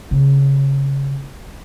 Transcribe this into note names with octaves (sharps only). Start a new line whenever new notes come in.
C#3